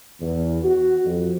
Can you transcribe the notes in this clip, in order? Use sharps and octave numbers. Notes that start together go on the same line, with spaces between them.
E2
F#4
F2